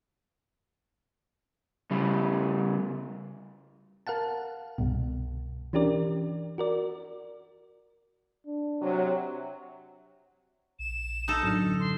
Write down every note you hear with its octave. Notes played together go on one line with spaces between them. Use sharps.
C#3 G3
A#4 F5 F#5 A5
C2 G2 B2
E3 C#4 D4 G4 A#4 D5
F#4 A#4 D5
D4
C3 F#3
A#1 E7
D#4 A4
F#2 A2 D3 F6
C6